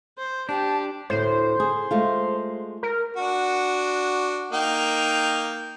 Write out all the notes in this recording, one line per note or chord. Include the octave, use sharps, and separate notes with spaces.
C5
D4 G4 A5
D2 A2 C5
G#4
G#3 A3 F4
A#4
D4 F#4
A#3 D#4 G5